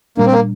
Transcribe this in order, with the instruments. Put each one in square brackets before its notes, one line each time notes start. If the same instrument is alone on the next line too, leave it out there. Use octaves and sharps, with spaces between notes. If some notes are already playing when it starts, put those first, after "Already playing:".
[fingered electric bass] A#2 G3 D4 [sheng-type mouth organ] A#3
[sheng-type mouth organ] C4
A#3